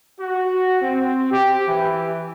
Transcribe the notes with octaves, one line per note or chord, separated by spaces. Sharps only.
F#4
C4
G4
E3